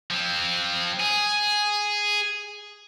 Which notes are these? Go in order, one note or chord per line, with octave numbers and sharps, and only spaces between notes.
F3 C4
G#4